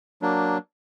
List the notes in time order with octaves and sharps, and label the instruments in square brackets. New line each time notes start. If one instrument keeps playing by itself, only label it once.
[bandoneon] F#3 A#3 D4